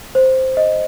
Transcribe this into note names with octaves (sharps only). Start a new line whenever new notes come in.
C5
D#5